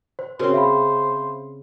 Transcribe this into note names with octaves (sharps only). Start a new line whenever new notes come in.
C5
C#3 C4 F#4 A#4 C5 C#5
E5 F5 B5